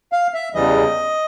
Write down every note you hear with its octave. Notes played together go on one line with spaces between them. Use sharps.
F5
E5
E2 C#3 E3 G3 D#5